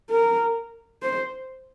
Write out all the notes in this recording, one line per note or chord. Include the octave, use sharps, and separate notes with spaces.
A#4
C5